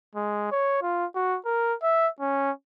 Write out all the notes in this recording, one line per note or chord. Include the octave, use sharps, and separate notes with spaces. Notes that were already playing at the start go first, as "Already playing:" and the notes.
G#3
C#5
F4
F#4
A#4
E5
C#4